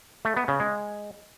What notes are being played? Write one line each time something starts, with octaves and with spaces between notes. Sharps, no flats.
A3
B3
C#3
G#3